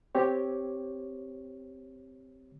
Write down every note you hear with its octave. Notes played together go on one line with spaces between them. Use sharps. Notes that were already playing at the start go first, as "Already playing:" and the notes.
C4 G4 C#5